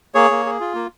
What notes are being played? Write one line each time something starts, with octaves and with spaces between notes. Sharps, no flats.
A#3 G#4 C#5
A#3
G#4
F4
A#3